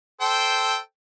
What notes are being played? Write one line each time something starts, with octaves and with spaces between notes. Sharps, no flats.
A4 C5 G5